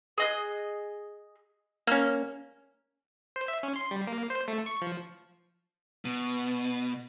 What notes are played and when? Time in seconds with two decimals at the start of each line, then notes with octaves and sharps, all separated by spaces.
0.18 G#4 D#5 F#6
1.87 A#3 C#4 F6
3.36 C5
3.48 E5
3.63 C#4
3.76 C6
3.91 G3
4.07 A#3
4.30 C5
4.48 A3
4.66 C#6
4.81 F3
6.05 B2